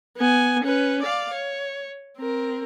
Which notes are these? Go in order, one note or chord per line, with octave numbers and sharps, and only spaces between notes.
B3 G#5
C#4 B4
D5 F5
C#5
C4 A#4